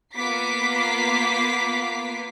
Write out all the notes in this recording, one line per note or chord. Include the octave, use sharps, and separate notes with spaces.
A#3 B3 F4 D6 B6 C7